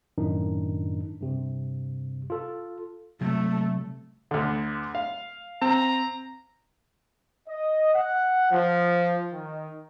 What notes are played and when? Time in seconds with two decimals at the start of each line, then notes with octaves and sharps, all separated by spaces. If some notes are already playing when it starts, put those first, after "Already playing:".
0.18 F#2 A2 D#3 D4 D#4
1.21 G2 C3
2.30 F4 A4
3.21 C3 F#3 A3
4.31 D2 D3
4.95 F5
5.62 C4 A#5
7.49 D#5
7.94 F#5
8.51 F3
9.33 D#3